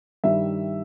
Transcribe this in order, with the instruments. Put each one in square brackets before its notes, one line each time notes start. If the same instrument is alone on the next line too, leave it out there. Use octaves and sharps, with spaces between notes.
[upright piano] G2 D#3 G3 E5